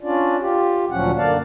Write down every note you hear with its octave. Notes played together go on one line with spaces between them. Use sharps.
C#4 D4 F4 D5
F4 G4
D2 A#2 F3 F#3 C#4 F#5
F#2 D3 A#3 D5 F5 A5